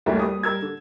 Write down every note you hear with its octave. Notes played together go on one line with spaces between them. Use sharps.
F#1 D2 G3 A3 E4 A#4
G3 A#3 D#6
G3 A#4 E6 G#6
D3